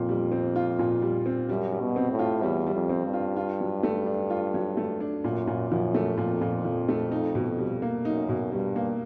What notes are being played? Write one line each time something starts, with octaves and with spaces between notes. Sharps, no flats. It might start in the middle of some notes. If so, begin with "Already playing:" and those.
Already playing: F2 A#2
G3
C4
F4
A#2
G3
C4
F#2 G3
G3
B2
C4
A2
F4
E2 G3
G3
F2
C4
G2
F4
F4
F#3
A3
D4
F4
F#3
A3
D4
F#2 A#2
A#2
F#2 F3
A3
F2 A#2
A#2
F3
A3
D#4
B2
G3
A#3
F#2 D#4
B2
G2 G3
A#3